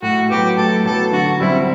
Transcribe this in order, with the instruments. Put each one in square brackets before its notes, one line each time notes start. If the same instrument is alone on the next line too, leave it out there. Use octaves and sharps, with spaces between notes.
[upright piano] A2 [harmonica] F#4
[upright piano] F#3 B3 [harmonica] G4
[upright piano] A2 [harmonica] A4
[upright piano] F#3 B3 [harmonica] A4
[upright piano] D3 [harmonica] F#4
[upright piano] G3 C4 [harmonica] E4